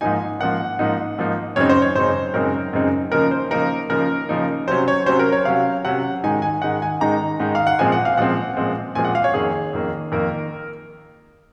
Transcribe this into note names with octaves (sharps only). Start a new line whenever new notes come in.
G#2 F3 A#3 D#4 G#5
G#2 F3 A#3 D#4 F#5
G#2 F3 A#3 D#4
G#2 F3 A#3 D#4
F#2 C#3 G#3 C4 D#4 C#5
C5
C#5
F#2 C#3 G#3 C4 D#4 C5
F#2 C#3 G#3 C4 D#4 A#4
F#2 C#3 G#3 C4 D#4
C#3 F3 A#3 D#4 A#4
C5
C#3 F3 A#3 D#4 A#4
C#3 F3 A#3 D#4 A#4
C#3 F3 A#3 D#4
C3 F#3 C#4 C5
C#5
C3 F#3 C#4 C5
A#4
C#5
C3 F#3 C#4 F5
C3 F#3 C#4 F#5
G#2 D#3 G#3 D#4 G#5
G#5
G#2 D#3 G#3 D#4 F#5
G#5
G#2 D#3 G#3 D#4 A#5
G#2 D#3 G#3 D#4
F5
F#5
A#2 F3 G#3 C4 G#5
F#5
F5
A#2 F3 G#3 C4 F#5
A#2 F3 G#3 C4
A#2 F3 G#3 C4 G#5
F#5
F5
C#5
F2 D#3 A#3 G#4
F2 D#3 A#3
F2 D#3 A#3 A#4